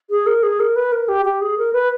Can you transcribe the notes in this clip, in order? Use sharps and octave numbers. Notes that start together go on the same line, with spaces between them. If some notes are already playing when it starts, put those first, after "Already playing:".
G#4
A#4
G#4
A#4
B4
A#4
G4
G4
G#4
A#4
B4